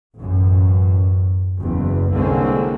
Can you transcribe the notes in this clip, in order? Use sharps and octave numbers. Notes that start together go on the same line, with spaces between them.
A1 F#2
F#1 E2
C2 D3 G#3 A#3 C4 C#4